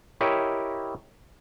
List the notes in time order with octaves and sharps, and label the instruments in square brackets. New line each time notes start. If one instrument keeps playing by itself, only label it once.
[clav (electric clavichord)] E4 G4 A#4 C#5 D#5